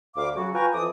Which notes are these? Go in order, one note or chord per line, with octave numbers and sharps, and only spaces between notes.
D2 F5 D6
C#3 F#3 F#4
F4 B4 G5 G#5 A#5 C#6
F2 E3 F3 D6 D#6